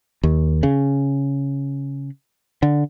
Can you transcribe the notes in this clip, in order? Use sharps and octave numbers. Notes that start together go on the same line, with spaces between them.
D#2
C#3
D3